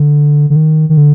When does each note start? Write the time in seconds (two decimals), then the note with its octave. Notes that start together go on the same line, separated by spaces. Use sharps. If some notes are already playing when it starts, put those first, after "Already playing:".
Already playing: D3
0.50 D3
0.56 D#3
0.89 D#3
0.97 D3